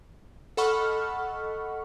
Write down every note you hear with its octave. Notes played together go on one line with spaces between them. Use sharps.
A4 D#5 F#5 B5 C#6 F6